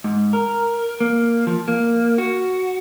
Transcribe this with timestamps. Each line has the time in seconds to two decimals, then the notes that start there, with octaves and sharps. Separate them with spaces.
0.04 G#2
0.33 A#4
1.00 A#3
1.47 F3
1.68 A#3
2.18 F#4